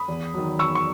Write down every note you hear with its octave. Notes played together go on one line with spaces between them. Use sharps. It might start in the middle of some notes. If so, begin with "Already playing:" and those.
Already playing: B5 D#6
E2
D#3 F#3
E2 C#6 E6
C#6